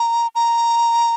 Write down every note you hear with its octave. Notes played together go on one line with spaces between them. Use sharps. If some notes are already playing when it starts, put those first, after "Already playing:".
Already playing: A#5
A#5